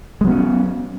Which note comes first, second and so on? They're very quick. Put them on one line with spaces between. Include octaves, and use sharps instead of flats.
G#3 F#3 B3 C#4